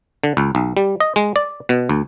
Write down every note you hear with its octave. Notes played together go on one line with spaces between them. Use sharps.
D3
C#2
B1
G3
D#5
G#3
D5
B2
D2